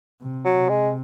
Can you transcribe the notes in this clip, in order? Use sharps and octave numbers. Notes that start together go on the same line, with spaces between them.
C3
F#3
C3
G#3